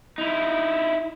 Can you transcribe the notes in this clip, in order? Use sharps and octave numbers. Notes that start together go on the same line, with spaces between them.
D#4 E4